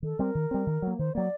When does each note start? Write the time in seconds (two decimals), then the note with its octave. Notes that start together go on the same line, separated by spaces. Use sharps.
0.03 D#3 A4
0.19 G3 C4 A#4
0.35 D#3
0.51 G3 C4
0.67 D#3
0.82 F#3 A#3
0.99 D#3 C5
1.15 F#3 A#3 D5